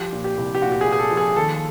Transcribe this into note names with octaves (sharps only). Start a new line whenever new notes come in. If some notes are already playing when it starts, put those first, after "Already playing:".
Already playing: F3 G4
A#2
G4
C2
G4
A#2 F#4
G4
G#4
A#2
G#4
A4
F3
G#4
D#2 A4